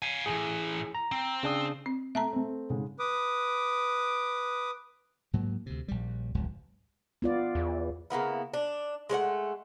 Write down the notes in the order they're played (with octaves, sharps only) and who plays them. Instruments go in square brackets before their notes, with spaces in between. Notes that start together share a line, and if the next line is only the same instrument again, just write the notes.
[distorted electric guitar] F5 G#5
[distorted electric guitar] A2 E3 [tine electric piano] G#4
[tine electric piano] A#5
[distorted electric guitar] C4
[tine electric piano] C#3 D4 D#6
[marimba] C4
[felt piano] A3 [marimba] E5 A5 A#5
[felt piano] A3 C4
G#2 C#3 G#3
[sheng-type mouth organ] B4 D6 D#6
[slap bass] G#2 F#3 A#3
D2 C3
A#1 G3
E1 C#2 G#2 F#3
[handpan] B3 F4 D5
[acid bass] E2
[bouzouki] C#3 A#3 B3 E4
D4
G#3 A3 C#5 F#5